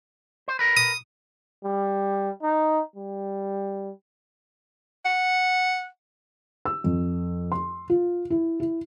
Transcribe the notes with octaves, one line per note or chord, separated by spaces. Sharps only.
C5
A#4 B4
D#6
G3
D#4
G3
F#5
E6
F2
C6
F4
E4
E4